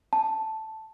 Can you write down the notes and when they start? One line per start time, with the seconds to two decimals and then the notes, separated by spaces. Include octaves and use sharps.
0.13 A5